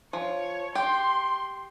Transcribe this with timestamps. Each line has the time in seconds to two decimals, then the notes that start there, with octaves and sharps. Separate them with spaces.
0.13 F3 C#5
0.75 G4 C6